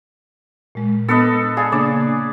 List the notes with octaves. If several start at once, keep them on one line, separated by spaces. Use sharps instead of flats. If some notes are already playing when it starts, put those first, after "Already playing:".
A#2 G#3
B3 D4 A4 B4 D#5
G#4 D5 F5 G#5
C#3 A#3 D4 D5